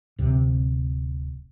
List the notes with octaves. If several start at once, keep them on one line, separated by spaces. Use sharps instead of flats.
D1 C3